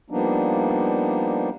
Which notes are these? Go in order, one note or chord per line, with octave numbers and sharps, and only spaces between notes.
F3 G3 A#3 B3 D4 D#4